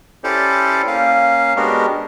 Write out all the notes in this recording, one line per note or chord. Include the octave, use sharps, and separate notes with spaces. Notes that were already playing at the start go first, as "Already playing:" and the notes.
C#4 E4 G4 A4 C5 D5
A#3 C#4 F5
G#3 B3 D4 F#4 G4 A#4